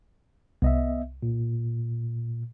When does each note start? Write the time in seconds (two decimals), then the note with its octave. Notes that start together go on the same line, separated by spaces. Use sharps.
0.62 C2 B3 D#5 E5
1.22 A#2